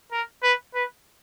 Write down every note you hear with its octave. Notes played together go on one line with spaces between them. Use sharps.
A#4
B4
B4